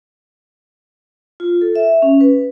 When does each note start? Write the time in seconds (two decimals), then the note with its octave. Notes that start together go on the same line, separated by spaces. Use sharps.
1.40 F4
1.61 A4
1.76 E5
2.02 C#4
2.21 B4